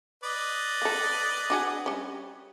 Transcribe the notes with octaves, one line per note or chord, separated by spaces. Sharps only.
B4 D5 D#5
A#3 A4
D4 F#4 G#4
G3 C#4